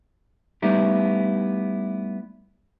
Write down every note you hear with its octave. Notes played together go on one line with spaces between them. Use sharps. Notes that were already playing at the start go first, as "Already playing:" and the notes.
G3 A3 B3 D#4 E4 G4